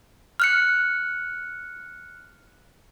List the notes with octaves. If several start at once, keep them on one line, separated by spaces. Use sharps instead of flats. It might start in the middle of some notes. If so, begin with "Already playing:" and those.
F6 F#6 C#7